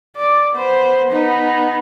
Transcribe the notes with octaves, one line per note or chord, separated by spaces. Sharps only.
D5
B3 C5
B3 D#4